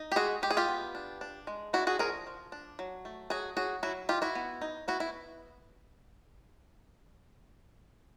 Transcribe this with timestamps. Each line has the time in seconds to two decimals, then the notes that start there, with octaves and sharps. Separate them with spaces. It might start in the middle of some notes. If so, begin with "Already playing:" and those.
Already playing: D#4
0.12 G4
0.16 G#3 F#4 G#4
0.42 G#3 G4
0.51 G#4
0.57 F4 G4
0.69 B3
0.95 D4
1.21 D4
1.47 G#3
1.73 D4 E4 F#4
1.87 F#4 G#4
1.99 F3 G#4 A#4
2.27 F3
2.52 D4
2.79 F#3
3.05 A3
3.30 F#3 F#4 G#4
3.57 F#3 F#4 G#4
3.83 F#3 E4 F#4
4.09 D#4 F4 G4
4.22 E4 F#4
4.35 B3
4.62 D#4
4.88 B3 E4 F#4
5.00 E4